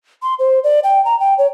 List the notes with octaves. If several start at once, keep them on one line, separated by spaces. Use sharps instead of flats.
C6
C5
D5
G5
A#5
G5
C#5